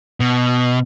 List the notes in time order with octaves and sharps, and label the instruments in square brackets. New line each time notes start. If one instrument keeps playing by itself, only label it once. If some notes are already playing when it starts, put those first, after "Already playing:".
[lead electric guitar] B2